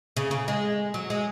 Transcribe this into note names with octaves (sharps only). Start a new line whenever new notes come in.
C#3
C#3
G#3
F#3
G#3